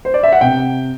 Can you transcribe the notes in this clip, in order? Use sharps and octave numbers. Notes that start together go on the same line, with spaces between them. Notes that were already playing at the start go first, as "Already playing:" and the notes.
C5
D5
E5
F#5
C3 G5